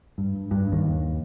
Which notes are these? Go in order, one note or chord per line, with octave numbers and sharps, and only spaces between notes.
G2
G2
D#2